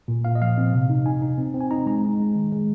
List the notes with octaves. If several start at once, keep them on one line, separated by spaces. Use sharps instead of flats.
A#2
A#2 F5
D#5
F3 F5
C4
C3
D#4
D#4 G#5
D#4
C4
C4
G#5
D#4 A#5
G#3 A#5
G#3
G#3
D#3
G#3